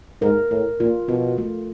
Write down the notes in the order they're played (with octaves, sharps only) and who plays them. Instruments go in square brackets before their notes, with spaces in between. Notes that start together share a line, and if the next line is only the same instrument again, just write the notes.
[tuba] G#2 [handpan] A#4
[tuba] A2 [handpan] A#4
[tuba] A#2 [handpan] F4
[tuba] B2 [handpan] F4
[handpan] A3